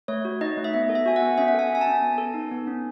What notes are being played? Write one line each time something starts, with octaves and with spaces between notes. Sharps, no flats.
A3 C#5
F#4
D#4 D#5
A3
E5
B3 D#5
A4
E5
F#4 G#5
F#5
B3
C#4 E5
F#5
A4 G#5
F#4
G#5
A5
C#4
B3
A4
D#4
B3
C#4